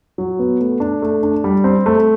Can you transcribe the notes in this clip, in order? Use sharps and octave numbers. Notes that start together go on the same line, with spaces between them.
F#3
B3
A3
D4
A3
D4
G3
C4
A3